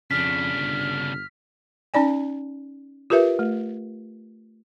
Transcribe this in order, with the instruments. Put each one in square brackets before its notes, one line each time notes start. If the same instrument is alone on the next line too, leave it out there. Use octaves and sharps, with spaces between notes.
[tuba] F2 [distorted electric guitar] C#3 D4 [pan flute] F6 [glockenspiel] B6
[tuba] G1
[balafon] C#4 D#4 D5 G#5
F4 G4 A#4 B4 E5
A3